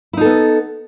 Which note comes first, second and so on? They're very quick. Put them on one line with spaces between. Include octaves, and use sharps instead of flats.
E4 D#4 A4 B3